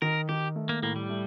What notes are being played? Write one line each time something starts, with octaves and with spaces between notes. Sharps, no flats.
D#3 A#4
D#3 G4
A3
A#3
A2 A#3
G3
A3